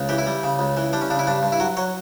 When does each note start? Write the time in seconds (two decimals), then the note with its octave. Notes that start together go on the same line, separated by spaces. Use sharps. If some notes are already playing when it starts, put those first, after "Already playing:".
Already playing: C#2
0.09 E3 G4
0.18 E4
0.27 G3
0.43 C#3
0.59 C#2
0.77 E3
0.93 G3 D4
1.01 C#4
1.10 C#3 D4
1.19 E4
1.27 G2 D4
1.43 G2
1.52 E4
1.60 F#3 F#4
1.77 F#3 C#5